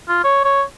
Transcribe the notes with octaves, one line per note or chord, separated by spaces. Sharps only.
F4
C#5
C#5